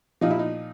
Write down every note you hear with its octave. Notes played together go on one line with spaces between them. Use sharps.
A#2 F3 D#4
E4
D#4